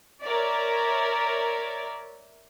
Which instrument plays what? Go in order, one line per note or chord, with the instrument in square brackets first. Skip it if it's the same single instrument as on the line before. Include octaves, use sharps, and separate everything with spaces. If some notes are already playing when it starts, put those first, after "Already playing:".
[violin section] A#4 C#5 D5 E5